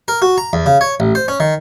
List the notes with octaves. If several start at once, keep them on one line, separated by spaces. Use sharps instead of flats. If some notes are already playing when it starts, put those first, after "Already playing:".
A#4
F#4
A#5
E2
C#3
C#5
A1
C5
C#4
D#3